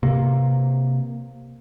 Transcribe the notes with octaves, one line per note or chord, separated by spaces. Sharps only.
C3 A#3